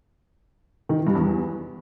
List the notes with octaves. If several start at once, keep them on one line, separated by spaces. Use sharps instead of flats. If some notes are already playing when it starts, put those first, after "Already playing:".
D#3
E3
G2
E2